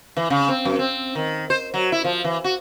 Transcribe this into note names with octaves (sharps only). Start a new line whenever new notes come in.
E3
C#3
C4
F#2
C4
D#3
C5
F#3
E4
F3
E3
F#4